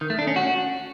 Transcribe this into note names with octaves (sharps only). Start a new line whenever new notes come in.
D#3
A3
D4
C#4
F#4